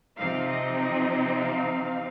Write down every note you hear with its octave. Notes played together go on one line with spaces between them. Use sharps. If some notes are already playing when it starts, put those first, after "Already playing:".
C3 F3 C4 D#4 F5
D#5
D#5
F5